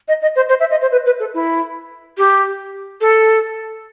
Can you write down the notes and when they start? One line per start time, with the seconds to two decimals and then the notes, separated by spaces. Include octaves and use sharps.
0.08 D#5
0.22 D#5
0.35 C5
0.49 C5
0.59 E5
0.70 D#5
0.81 C5
0.91 B4
1.06 B4
1.19 A4
1.34 E4
2.17 G4
3.01 A4